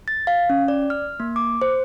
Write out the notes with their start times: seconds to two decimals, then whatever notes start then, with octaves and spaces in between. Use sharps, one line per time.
0.08 A6
0.27 F5
0.50 C#4
0.68 D5
0.90 F6
1.20 A#3
1.36 D6
1.62 C5